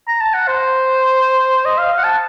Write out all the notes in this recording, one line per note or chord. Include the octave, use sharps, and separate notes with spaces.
A#5
A5
F#5
C5
D#5
F5
F#5
A5